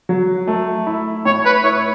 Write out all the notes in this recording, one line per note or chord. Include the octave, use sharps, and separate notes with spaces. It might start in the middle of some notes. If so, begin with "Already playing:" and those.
F#3
A3
E4
A2 C#5
B4
E4 C#5